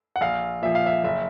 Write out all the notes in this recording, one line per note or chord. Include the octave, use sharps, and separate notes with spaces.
F#5
A#1 F5
A#2 F3 E5
F5
E5
F#1 E5